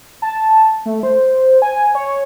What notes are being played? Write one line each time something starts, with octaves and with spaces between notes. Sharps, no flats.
A5
A3
C5
G#5
C#5